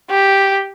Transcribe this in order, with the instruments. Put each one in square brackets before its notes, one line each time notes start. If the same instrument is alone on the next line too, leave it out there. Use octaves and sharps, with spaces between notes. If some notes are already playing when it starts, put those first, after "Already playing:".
[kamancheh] G4